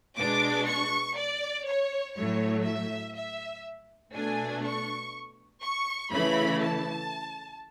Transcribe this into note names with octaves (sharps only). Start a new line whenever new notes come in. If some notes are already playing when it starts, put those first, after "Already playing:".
B2 G#3 D4 D6
C#6
D5
C#5
A2 F#3 A3 C#5
E5
E5
B2 A3 D4 G#5
C#6
C#6
C#3 E3 A3 E4 B5
A5